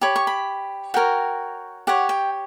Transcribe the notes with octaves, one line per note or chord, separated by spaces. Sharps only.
G4 C#5 B5
C#6
B5
F#4 A#4 C#5 G5
G4 C#5 F#5
G5